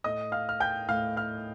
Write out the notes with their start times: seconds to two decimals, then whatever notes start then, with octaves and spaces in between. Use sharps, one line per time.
0.04 A2 A3 D#5 D#6
0.32 F5 F6
0.49 F6
0.60 G5 G6
0.88 A2 A3 F5 F6
1.17 F5 F6